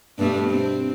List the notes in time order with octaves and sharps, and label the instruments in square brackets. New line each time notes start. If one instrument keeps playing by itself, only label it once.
[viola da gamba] G2 B2 A3
C4